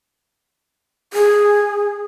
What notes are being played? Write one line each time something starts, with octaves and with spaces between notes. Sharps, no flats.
G#4